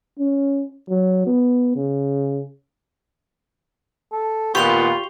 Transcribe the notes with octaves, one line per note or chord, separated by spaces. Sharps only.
C#4
F#3
B3
C#3
A4
A#2 D#3 B3 F4 G4 C#6 F7 G7